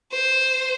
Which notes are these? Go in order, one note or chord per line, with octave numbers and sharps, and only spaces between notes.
C5